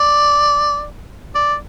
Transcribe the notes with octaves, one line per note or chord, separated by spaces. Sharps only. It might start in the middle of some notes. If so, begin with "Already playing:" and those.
Already playing: D5
D5